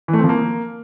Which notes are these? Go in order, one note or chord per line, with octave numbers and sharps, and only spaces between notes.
E3
A3
C4
F3
A#3